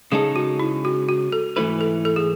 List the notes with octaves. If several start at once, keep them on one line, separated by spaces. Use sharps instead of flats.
C#3 G#3 D#4 G#4 A4
F#4
E4
F#4
F#4
A4
G#2 E3 A3 E4 A4 B4
A4
A4
G#4